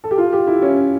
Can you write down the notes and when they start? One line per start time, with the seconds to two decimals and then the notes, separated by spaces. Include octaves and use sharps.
0.04 A4
0.11 G4
0.18 F4
0.33 G4
0.47 E4
0.62 C#4